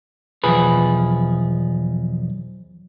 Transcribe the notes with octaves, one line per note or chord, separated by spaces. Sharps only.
B1 E2 F3 G#4 B4